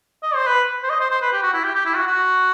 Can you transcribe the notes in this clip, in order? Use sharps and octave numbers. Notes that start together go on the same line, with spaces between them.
D#5
C5
B4
C5
D#5
C5
C5
B4
G4
F#4
E4
G4
G4
E4
F#4
F#4